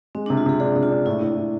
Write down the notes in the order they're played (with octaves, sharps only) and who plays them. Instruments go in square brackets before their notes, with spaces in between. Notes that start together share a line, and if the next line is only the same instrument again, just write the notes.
[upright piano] G#3 [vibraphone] C4
[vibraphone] D4
[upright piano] C3
[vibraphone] F4
[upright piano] C3 [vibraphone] G#4
[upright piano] D4 [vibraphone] G#4
[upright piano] C3
[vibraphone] F4
[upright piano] D4
[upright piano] A2 [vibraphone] E4
[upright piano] A2
A2